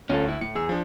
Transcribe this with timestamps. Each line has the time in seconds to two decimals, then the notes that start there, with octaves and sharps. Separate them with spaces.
0.09 D2 C#4 F4 A4
0.28 E4
0.41 A2 C#7
0.55 E2 G#4 E6
0.69 F3 D4